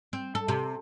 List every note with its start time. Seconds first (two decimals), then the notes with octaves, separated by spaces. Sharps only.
0.13 C4
0.35 A4
0.48 C3